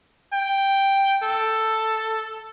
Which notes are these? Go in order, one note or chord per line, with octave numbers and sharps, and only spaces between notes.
G5
A4